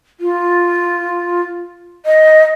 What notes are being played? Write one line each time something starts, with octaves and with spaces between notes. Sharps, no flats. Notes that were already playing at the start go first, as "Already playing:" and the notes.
F4
D#5